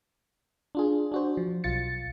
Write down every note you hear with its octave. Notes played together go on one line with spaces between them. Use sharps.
D4 F4 G#4
D4 F#4 C5
F3
B1 F4 A6 C#7